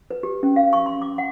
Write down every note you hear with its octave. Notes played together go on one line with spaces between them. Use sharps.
B4
G4
C#4
F5
C#6
C6
D6
F#5